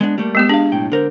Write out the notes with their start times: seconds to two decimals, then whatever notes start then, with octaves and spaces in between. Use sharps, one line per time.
0.01 G#3 B3 D4
0.18 G3 A3 A#3
0.35 G#3 B3 G4
0.49 D4 G#4 F5
0.72 B1 A2 G5
0.92 D3 A#4 C5